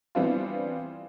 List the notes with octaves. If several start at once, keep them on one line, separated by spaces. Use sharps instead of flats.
E3 G3 B3 C4 D4 F4